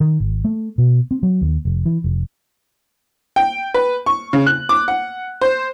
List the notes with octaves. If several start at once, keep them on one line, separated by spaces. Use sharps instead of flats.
D#3
G#1
A3
B2
C4
F#3
D#2
F1
E3
F1
G5
B4
C#6
C#3
F#6
D6
F#5
C5